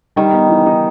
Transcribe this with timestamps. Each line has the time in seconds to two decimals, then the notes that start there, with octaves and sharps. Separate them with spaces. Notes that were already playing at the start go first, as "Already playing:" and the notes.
0.16 D#3 G3
0.33 B3
0.50 E3
0.66 D#4